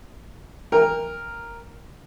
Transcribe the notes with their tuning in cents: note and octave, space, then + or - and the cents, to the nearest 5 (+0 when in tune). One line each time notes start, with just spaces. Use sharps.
A#4 +0 G5 +35